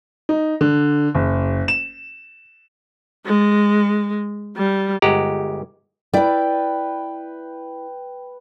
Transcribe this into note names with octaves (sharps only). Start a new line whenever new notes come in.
D#4
D3
F#1
E7
G#3
G3
G1 G#3 G4 F#5 A#5
E4 B4 D5 G5